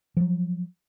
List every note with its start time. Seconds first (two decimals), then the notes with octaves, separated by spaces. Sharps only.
0.17 F3 F#3